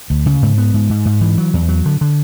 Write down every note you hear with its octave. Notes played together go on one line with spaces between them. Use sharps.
D2
C#3
G#2
B3
G#2
G#2
G#2
E3
F#3
E2
F#3
D3
D3